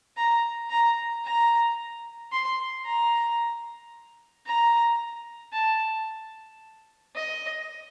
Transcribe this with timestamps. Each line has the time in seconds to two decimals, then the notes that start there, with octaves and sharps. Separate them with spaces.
0.17 A#5
0.70 A#5
1.25 A#5
2.32 C6
2.85 A#5
4.47 A#5
5.53 A5
7.15 D#5